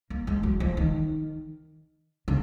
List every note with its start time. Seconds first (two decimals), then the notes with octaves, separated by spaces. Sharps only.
0.10 A#3
0.27 G#3
0.43 F#3
0.60 F3
0.77 D#3
2.28 C#3